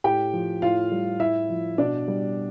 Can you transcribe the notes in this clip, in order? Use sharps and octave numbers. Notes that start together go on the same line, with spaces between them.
A2 G4 G5
F3
A2 F4 F5
G3
A2 E4 E5
F3
B2 D4 D5
G3